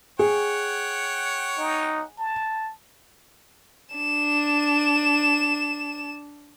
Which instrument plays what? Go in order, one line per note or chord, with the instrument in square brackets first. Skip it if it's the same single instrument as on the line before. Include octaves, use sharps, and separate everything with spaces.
[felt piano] G#4 [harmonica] C#5 F#5 G5
[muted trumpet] D#4
A5
[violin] D4 E7